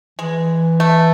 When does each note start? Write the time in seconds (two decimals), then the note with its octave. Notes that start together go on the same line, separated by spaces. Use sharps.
0.19 E3 G#3
0.80 A3